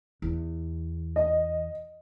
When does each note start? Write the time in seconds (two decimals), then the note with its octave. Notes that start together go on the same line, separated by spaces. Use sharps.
0.22 E2
1.16 D#5